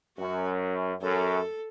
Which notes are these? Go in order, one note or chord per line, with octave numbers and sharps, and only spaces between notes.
F#2 F#4
F#2 A4